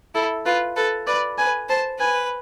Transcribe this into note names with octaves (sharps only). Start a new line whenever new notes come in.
E4 A4
F4 B4
A4 B4
B4 D5
B4 G#5
C5 A5
B4 G#5